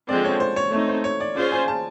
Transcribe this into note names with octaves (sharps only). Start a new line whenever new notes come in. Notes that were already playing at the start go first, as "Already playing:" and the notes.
D3 F3 G#3 C4 D5
C#5
C5
C#5
A3 C4 D#4 C#5
C5
C#5
D5
C#4 F4 G#4 C5 D5
G#5
A5